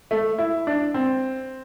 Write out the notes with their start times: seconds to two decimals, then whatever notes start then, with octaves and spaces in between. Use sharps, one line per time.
0.11 A3
0.38 E4
0.67 D4
0.94 C4